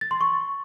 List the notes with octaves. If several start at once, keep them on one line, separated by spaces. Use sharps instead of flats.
A6
C6
C#6